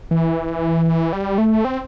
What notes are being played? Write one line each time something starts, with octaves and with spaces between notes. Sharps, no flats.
E3
G3
A3
C4